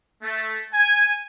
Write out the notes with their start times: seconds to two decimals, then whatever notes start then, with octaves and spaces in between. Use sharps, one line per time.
0.22 A3
0.73 G#5